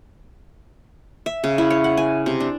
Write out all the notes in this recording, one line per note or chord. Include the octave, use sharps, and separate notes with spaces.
E5
C#3
E4
C#5
F#5
G#5
C3
D4